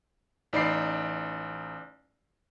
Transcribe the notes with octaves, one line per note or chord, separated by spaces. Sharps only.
A1 D#4 D5 B5 C7